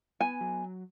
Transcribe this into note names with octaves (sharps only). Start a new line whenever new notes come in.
B3 G#5
F#3